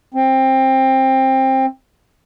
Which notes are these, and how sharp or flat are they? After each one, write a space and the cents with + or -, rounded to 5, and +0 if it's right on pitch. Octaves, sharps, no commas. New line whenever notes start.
C4 +20